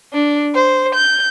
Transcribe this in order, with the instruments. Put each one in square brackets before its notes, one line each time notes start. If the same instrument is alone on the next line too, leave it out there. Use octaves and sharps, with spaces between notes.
[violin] D4
C5
G6